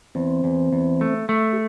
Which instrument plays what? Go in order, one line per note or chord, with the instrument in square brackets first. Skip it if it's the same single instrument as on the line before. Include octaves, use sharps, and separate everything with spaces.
[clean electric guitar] E2 [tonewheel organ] C4
[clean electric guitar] E2
E2
A3
A3
[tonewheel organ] G4